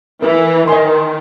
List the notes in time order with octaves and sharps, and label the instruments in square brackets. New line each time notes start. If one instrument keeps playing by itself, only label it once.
[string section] E3 [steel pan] A#4
[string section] D#3 [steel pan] D#5 G#5 C6